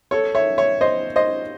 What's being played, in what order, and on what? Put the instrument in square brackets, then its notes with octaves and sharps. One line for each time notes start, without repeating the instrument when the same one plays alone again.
[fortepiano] A4 C#5
C#5 E5
C#5 E5
C5 D#5
C5 D#5